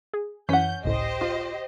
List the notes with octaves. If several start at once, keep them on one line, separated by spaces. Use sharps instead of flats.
G#4
F#2 E3 C#4 F#5 G6 B6
G#1 C#2 A2 G4 C5 D#5
F4